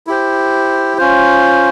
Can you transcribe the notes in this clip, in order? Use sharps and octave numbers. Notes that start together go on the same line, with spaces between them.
E4 G4 C5
C#4 F4 C5